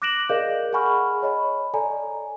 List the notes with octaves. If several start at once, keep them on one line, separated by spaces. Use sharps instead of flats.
D6 F#6 A#6 D7 E7 F#7
G#4 A#4 D5 D#5 F5 G6
G#4 F#5 G#5 B5 C#6 F6
C#5 D#5 B5
A4 D5 G#5 A#5